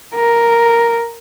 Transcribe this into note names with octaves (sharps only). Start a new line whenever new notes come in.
A#4